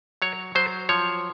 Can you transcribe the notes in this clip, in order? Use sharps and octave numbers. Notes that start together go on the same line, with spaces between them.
F#3 C#5
F#3 C5
F3 C#5